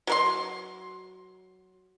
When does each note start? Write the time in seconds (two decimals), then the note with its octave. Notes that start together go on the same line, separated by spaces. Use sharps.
0.07 F#3 A#4 C6